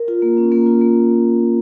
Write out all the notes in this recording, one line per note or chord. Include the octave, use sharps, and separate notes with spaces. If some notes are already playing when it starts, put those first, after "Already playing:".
Already playing: A#4
F4
A#3
C#4
A#3
F4
A#3